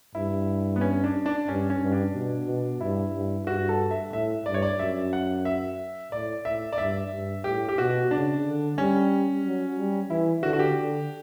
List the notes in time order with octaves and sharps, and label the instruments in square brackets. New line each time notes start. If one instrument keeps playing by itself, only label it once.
[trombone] G2 [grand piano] E4
[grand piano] B3
C#4
D4
D4
[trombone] G2 [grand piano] C#4
[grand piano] C#4
[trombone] G2
[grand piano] D4
[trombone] B2
B2
[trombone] G2 [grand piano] E4
[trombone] G2
[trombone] G2 [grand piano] F#4
[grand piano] A4
E5
[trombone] A2 [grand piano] E5
[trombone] G2 [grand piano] D5
[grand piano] C#5
D5
[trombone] F#2 [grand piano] E5
[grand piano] F#5
E5
[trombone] A2 [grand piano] D5
[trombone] A2 [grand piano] E5
[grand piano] D5
[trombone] G2 [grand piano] E5
[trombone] G2
[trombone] A2 [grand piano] G4
[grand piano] G4
[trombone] B2 [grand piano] F#4
[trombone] C#3 [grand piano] D4
[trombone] D3
[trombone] G3 [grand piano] C#4
[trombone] F#3
G3
[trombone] E3 [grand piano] E4
[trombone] D3 [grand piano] F#4
[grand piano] F#4
G4
[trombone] D3